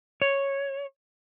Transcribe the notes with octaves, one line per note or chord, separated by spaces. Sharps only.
C#5